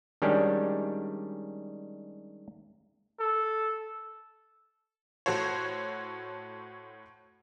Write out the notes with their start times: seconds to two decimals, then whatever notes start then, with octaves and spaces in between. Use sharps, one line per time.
0.22 D#3 G3 G#3 C#4 D4 G4
3.20 A4
5.26 A2 F#4 A4 C5 C#5